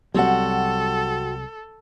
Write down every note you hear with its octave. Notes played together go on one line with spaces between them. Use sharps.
C2 F#3 G3 C4 F#4 A4 F#5